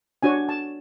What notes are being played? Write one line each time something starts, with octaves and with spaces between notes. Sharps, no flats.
D4 F#4 C#5 G#5
A5